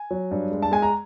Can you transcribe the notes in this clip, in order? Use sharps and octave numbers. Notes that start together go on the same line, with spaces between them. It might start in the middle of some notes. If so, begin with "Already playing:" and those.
Already playing: G#5
F#3
G2
G#3
A5
G#3 G#5
A#5